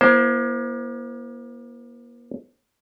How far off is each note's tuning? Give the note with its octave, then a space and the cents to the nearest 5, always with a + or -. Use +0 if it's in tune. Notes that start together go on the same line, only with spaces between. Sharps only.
A#3 +40 E4 +30 C5 +0